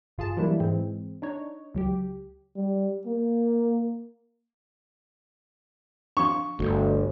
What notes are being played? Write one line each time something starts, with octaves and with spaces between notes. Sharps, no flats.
G1 F4 G#4 A5
E3 F#3 G3 A#3 D4 E4
G#2 E3 G#3 C4
D4 D#4 C#5
C#2 F#3 G4
G3
A#3
F3 D4 C#6
G1 D2